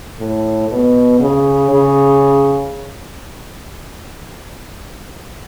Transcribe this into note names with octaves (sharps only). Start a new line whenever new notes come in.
A2
B2
C#3
C#3